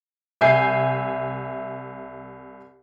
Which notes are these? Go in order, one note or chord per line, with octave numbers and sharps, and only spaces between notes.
C2 E5 G#5 G6 C7